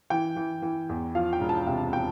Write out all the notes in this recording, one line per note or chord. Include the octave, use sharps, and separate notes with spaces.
E3 G5
E3
E3
E2
F3 F5
G5
E1
A5
C3 G5
F3 G5